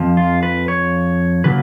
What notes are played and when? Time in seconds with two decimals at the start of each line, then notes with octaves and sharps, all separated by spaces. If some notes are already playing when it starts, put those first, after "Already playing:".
Already playing: F2 F3
0.17 F4
0.43 B4
0.68 C#5
1.44 C#3 F#3 A#3 B4